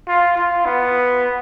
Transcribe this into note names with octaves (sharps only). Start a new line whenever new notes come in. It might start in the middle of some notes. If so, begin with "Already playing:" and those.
F4
F4
B3